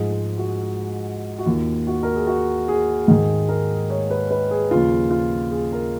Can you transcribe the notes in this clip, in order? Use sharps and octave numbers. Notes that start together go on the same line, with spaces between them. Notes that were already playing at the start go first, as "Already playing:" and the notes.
Already playing: G#2 F3 G#4
G#4
F#4
F#4
D#2 D#3 F4
F#4
A#4
G#4
F#4
G#4
G#2 D#3 G#4
A#4
C#5
B4
B4
G#4
D#2 C#3 F3 F4
F4
G#4
A#4